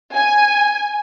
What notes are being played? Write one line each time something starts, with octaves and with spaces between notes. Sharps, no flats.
G#5